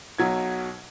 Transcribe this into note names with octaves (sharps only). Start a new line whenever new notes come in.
B1 B2 F#3 G#6